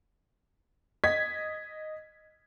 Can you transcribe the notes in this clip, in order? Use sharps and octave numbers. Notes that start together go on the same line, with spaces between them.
D#5 G#6 B6